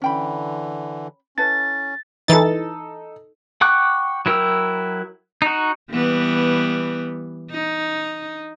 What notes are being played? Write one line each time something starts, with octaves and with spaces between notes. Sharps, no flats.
D3 E3 C#4 G5 B5
C#4 E4 A4 B4 A6
E3 D#4 A4 A6
F#5 G5 C#6 D6 F#6
F#3 E4 A#4 G5 E6
D#4 F#4
E3 G3 B3
D#4